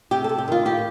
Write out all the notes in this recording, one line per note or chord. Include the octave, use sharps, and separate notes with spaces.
C3 G4
A4
C3
G4
D#3 F4
A2 G4